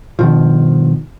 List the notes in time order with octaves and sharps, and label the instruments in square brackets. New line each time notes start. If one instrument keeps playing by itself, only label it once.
[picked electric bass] G2 B2 D#3 F3